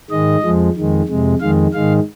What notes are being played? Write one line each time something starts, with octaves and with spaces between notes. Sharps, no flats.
G#2 D#3 G#3 D#5
F2 F3 G#3
F2 D#3 G#3
F2 C3 G#3
F2 D#3 G#3 F5
G#2 D#3 G#3 F5